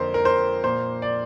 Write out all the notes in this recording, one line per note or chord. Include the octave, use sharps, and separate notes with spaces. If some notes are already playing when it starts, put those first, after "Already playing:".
Already playing: F2 D3 A#3 A#4 C5
A#4
C5
A#2 A#3 C5
D5